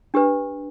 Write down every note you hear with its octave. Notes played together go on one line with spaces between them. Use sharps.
D4 G4 B4